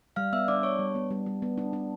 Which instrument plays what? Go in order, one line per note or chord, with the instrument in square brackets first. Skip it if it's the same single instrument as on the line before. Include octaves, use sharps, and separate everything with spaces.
[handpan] G3 [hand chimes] F5 F6
[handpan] B3 [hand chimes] E5 E6
[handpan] D4 [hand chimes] D5 D6
[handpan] D4 [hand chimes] C#5 C#6
[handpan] G3
B3
G3
G3
B3
D4
D4